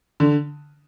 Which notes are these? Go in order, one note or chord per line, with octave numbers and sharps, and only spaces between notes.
D3